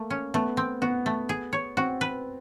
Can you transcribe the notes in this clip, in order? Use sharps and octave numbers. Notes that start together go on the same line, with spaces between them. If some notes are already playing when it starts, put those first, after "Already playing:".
Already playing: A3 A#3
C#4
A3 B3
C4
B3 F#4
A3
G#4
C#5
C4 F#4
B4